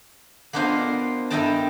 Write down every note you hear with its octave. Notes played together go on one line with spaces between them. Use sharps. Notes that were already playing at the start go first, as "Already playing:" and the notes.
A#3 B3 D4 F4 C5 D#5
G2 D#4 E4 D#5 G5 A5